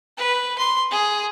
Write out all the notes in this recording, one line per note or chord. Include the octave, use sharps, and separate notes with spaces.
B4
C6
G#4